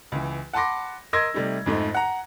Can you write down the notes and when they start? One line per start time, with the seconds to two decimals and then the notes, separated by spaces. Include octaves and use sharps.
0.12 C#2 E3
0.53 F#5 A5 B5 C6 D6 A#6
1.13 A#4 D#5 C6 E6 G#6 A#6
1.34 C3 G3 A3 D#4
1.66 F2 G#2 A3 D#4
1.95 F#5 A#5